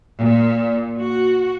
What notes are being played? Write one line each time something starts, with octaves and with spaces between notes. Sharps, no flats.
A#2
F#4